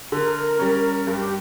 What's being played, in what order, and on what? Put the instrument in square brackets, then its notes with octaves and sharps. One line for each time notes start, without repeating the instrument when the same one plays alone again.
[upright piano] D3 [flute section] A#4
[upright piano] G3 C#4
[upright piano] G2 [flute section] G4